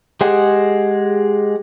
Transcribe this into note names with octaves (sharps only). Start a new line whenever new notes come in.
G#3 G4 G#4 C5 F#5